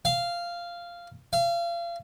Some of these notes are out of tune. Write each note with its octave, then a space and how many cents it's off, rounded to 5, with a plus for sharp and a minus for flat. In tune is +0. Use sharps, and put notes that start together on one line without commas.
F5 -10
F5 -35